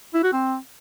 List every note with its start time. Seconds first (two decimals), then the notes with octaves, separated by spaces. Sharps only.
0.14 E4
0.23 F#4
0.33 C4